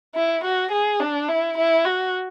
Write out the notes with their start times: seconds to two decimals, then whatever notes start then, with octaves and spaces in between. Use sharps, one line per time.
0.15 E4
0.44 F#4
0.72 G#4
1.00 D4
1.28 E4
1.58 E4
1.85 F#4